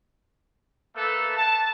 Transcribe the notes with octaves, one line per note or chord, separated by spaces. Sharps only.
A3 A#3 A4 B4
A5